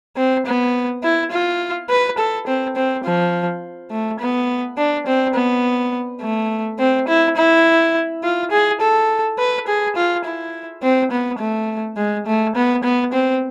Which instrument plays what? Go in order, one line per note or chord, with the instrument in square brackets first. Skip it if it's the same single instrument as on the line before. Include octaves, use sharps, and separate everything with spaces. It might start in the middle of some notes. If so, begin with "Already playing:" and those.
[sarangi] C4
B3
E4
F4
B4
A4
C4
C4
F3
A3
B3
D4
C4
B3
A3
C4
E4
E4
F4
G#4
A4
B4
G#4
F4
E4
C4
B3
A3
G#3
A3
B3
B3
C4